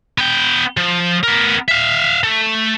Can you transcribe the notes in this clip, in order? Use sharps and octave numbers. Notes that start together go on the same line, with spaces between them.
B3 G5
F3
B3 A#4
E5 F5
A3